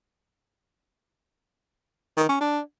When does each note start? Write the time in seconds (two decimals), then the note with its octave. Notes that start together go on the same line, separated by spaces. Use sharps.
2.17 D#3
2.29 C#4
2.41 D4